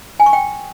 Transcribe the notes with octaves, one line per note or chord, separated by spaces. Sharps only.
G#5
C#6
G5